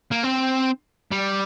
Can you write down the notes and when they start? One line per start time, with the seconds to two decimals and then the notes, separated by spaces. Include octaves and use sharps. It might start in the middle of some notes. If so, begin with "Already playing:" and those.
0.11 A#3
0.23 C4
1.11 G3